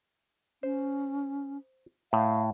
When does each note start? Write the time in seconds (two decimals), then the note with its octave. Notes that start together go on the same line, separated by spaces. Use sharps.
0.63 C#4 C5
2.13 A2 F5